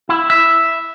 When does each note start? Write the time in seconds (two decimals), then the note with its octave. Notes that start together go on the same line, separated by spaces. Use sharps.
0.09 E4
0.30 E5